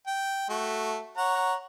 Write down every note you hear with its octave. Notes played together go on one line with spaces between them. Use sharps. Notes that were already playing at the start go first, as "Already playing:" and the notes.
G5
A3 F#4
C#5 F#5 A#5